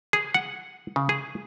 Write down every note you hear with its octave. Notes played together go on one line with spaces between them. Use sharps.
G#4
F#5
C#3
G#4